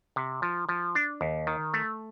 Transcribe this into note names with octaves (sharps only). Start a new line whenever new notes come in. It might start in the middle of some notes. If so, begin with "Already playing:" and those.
C3
F3
F3
D4
D#2
D#3
A3